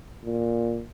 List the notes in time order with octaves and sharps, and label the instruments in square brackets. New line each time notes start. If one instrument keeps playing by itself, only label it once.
[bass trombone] A#2